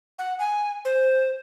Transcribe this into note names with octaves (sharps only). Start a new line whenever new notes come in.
F#5
G#5
C5